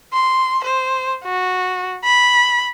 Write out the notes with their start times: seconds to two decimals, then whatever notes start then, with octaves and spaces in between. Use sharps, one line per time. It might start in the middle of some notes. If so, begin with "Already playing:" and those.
0.13 C6
0.65 C5
1.24 F#4
2.04 B5